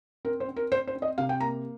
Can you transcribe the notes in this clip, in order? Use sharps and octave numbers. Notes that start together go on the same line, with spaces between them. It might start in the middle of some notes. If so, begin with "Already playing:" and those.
C4 A#4
C5
C4
A#4
C4 C5
C5
C4
D#5
C3 F5
G5
A#3 A#5